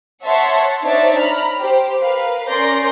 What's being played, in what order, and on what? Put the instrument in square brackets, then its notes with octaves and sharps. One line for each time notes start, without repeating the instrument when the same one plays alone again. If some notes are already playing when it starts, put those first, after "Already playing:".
[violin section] C#5 E5 F#5 A5 C6
D4 D#4 C5 C#5 E5 A5
A#5 B5 F6
G4 C5
A#4 B4 F5
C#4 A#4 D5 C6 G6 A#6